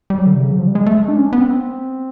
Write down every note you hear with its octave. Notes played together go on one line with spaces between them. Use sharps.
G3
F#3
D3
C3
C#3
F#3
F3
G3
G#3
A3
G#3
D4
C#4
B3
C4